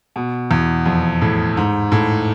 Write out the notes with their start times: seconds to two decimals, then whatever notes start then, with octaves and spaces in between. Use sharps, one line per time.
0.16 B2
0.51 E2
0.86 F2
1.21 A2
1.57 G#2
1.92 A2